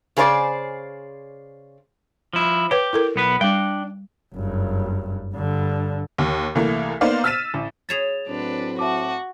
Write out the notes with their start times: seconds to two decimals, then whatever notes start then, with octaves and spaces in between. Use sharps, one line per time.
0.17 C#3 G#4 C5 D5
2.33 F3 E4
2.71 G4 B4 C#5
2.93 E4 A4 A#4
3.16 B1 B3 B4
3.41 G3 D4 G5
4.35 F#1 G2
5.34 G2 D3
6.18 D#2
6.55 C2 E3 A3 A#3
7.01 A#3 B3 D#4 C5 D5 F5
7.24 E6 F6 A6 B6 D#7 E7
7.54 A1
7.89 G#4 C#5 B5 A6 E7 F7
8.28 A2 F#3 C4 D4 B4
8.79 F#4 E5 A5 D6